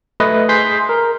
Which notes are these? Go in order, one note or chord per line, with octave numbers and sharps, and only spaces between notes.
A3 B4 D#5
G#4 C6 G6 B6
A#4